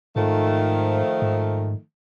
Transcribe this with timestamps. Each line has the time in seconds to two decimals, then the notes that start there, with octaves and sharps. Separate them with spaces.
0.16 G#2 D#3 F3 A3
1.22 G#2